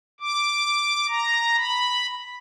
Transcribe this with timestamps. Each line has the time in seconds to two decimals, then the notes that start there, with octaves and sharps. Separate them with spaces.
0.21 D6
1.09 A#5
1.57 B5